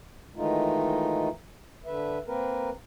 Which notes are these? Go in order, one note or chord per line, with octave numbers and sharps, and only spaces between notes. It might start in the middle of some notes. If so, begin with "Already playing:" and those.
D#3 E3 G#3 A3 D#4 F4
D3 B4 E5
A#3 C4 A#4 B4